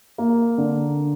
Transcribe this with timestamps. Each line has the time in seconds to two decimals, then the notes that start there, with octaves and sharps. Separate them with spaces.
0.18 A#3
0.58 D3